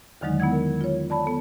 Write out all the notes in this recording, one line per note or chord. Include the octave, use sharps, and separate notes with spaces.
E2 D3 D#3 F#3 G#3 D#4
B3 E4 F#5 G#6
A#4
F4 C#5
D5 A5 B5
B3 A4